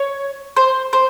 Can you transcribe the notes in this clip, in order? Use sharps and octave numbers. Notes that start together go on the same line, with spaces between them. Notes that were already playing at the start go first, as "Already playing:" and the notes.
Already playing: C#5
C5
C5